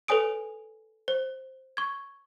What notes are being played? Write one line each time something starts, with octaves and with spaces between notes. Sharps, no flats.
A4 B4 C#5 G#5 D#6 D7
C5
C#6 G#6